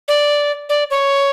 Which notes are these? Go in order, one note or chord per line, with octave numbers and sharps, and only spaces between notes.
D5
D5
C#5